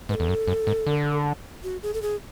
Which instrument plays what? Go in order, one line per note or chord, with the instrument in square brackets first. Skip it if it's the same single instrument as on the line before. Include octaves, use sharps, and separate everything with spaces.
[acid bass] G#2 [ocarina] B4
[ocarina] A4
[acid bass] E2
F#2
F#2
G#2
D3
[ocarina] F#4
G#4
A4
G#4